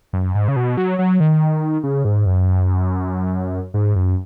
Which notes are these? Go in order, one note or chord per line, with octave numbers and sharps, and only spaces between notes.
F#2
G#2
C#3
B2
F#3
F#3
D#3
C#3
G#2
F#2
G#2
F#2